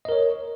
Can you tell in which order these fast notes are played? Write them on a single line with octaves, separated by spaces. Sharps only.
D#5 A#4 C#5